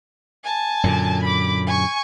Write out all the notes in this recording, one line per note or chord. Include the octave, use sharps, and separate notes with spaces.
G#5 A5
F#2 A#2 D3
B5 D6
G#5 C#6